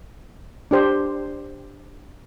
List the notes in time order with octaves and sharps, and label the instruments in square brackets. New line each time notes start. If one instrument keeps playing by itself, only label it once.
[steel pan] D4 G4 C5